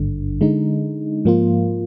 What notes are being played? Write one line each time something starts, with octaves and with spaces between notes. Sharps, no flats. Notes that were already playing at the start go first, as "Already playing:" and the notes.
Already playing: G#1 G2 D3
D3 G#3 D#4
G#2 F3 A#3 F4